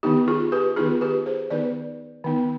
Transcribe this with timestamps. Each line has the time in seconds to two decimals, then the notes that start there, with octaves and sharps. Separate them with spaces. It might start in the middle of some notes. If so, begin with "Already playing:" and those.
0.03 D#3 B3 D#4 G4
0.28 F4 G#4
0.52 G4 B4
0.76 D#3 B3 D#4 F4 G#4
1.01 G4 B4
1.26 G#4 C5
1.50 D#3 B3 D#4 B4 D5
2.24 D#3 B3 D#4